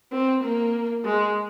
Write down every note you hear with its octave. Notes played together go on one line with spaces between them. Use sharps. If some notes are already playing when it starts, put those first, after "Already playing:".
C4
A#3
G#3